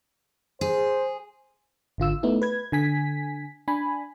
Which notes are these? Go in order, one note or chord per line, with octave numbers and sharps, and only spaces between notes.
G#4 C5
G#1 D3 F4 E6
A3 B3 D#4 E4
B4 G#6
D3 G#5 B6
D4 G#5 B5